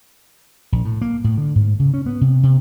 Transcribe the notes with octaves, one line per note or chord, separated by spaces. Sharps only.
A#1
A2
A#3
A2
D3
G#2
C#3
C#4
B3
C3
C3